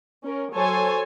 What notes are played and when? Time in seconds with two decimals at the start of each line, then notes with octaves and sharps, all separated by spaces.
0.24 C#4 A#4
0.54 F#3 A4 C5 C#5 G#5 A5